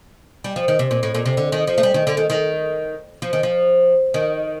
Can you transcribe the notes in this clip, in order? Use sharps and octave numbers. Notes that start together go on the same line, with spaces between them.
G3
F3
D#3
C3
A#2
A2
A#2
C3
D3
D#3
F3
A3
G3
D#3
D3
D#3
D#3
F3
D#3
F3
D#3